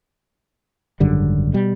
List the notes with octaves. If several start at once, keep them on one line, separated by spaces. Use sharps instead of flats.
G#1 F#2 D3 G3
B2 G3